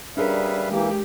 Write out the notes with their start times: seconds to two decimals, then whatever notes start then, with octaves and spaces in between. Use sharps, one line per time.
0.17 G3 C#4 D4 G#4 A#4 B4 E5 F5
0.69 E3 G#3 A#3 G4